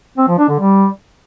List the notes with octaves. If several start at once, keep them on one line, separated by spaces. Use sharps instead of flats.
C4
F3
D4
D3
G3